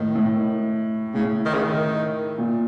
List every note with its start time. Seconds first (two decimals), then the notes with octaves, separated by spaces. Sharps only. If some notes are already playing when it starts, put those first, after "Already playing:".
Already playing: A2 D#3
0.15 A2
1.14 A2 C#3
1.45 D#3
1.54 C#3
1.63 D#3
2.38 A#2